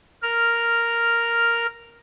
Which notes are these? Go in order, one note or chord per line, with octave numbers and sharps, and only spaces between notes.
A#4 F6